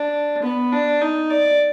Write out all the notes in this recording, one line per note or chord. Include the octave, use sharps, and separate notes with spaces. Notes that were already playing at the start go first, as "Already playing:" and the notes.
Already playing: D4
B3
D4
D#4
D5